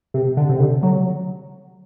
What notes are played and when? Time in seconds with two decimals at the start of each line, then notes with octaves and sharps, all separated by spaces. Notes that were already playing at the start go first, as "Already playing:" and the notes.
0.14 C3
0.37 D3
0.49 C3
0.60 D3
0.83 F#3